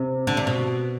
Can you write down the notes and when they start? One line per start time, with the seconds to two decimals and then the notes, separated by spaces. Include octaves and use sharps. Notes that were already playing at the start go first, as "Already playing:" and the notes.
Already playing: C3
0.27 D3
0.37 C3
0.47 B2